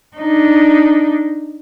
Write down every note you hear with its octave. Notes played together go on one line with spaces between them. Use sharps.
D4 D#4